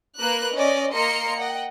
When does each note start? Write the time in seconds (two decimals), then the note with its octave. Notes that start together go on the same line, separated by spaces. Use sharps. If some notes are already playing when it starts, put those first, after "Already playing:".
0.19 A#3 A#4 B4 F#6
0.56 C#4 D5 D#5
0.94 A#3 A#4 D#5 A#5 C6 C#7
1.37 D#5 F#5 G5